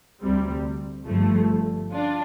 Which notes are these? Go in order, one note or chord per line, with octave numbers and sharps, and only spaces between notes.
D2 C3 G3 C4
G1 G2 F3 A3
D4 F4